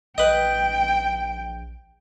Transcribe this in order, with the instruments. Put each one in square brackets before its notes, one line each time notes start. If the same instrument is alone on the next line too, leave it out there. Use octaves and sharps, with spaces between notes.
[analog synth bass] A#1 [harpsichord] B4 D#5 [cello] G5